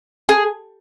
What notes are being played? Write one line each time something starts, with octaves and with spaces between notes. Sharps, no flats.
G#4